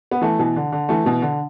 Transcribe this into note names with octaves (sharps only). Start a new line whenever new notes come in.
B3
E3 A3
B2 E3
D3
D3
E3 A3
B2 E3
D3